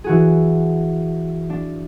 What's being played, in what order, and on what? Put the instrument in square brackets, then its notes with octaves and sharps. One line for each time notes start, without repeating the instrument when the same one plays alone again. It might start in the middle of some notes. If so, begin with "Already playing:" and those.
[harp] E3 F#4 G#4
D4